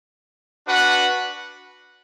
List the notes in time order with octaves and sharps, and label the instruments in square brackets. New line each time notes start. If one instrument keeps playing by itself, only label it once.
[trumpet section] D4 F#4 B4 F#5